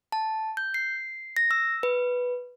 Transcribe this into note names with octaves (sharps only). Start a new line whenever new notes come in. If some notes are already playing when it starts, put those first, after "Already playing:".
A5
G6
C7
A#6
E6
B4